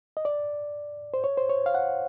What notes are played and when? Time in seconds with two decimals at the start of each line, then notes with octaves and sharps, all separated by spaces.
0.17 D#5
0.25 D5
1.14 C5
1.24 C#5
1.37 C5
1.49 C#5
1.66 F5
1.75 F#5